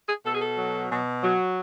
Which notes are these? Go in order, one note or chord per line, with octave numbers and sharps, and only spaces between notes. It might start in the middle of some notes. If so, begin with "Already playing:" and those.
G#4
B2 A4
G#4
A4
F#3
B2
F#3